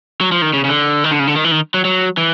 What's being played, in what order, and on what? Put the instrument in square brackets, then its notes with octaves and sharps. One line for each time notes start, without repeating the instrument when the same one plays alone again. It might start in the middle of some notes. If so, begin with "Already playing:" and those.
[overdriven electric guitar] F#3
F3
D#3
C#3
C#3
D3
D#3
D3
C#3
D3
D#3
E3
D#3
F#3
F#3
E3